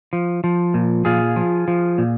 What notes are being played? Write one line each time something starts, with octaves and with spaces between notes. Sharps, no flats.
F3
F3
A#2
A#2 F4 G#4
F3
F3
A#2